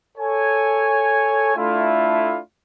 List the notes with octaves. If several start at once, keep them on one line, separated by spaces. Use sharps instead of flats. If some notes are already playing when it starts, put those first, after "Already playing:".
A4 C#5 G#5
A3 D4 E4 F4